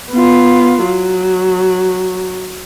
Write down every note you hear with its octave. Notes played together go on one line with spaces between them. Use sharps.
B3 F4
F#3